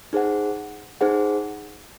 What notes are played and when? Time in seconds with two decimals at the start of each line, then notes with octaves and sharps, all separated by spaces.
0.13 D#4 G#4 C5 F#5
1.01 D#4 G#4 C5 F#5